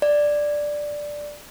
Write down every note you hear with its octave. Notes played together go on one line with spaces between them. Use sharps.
D5